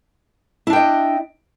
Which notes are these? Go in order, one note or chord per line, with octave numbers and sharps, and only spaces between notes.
D4 E4 D#5 G5